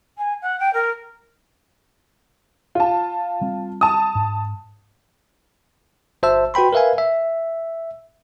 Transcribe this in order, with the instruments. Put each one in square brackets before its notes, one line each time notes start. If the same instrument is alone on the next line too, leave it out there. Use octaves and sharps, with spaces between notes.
[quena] G#5
F#5
G5
A#4
[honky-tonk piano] F4 A5
[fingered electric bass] G3 C4
[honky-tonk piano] A5 D#6
[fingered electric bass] G#2
[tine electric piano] G1 C5 E5 A5 E6
F#4 B4 G5 B5 C6
A#4 B4 E5 F5 G#5
E5